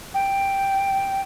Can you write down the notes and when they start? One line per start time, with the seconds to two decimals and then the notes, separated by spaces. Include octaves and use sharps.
0.14 G5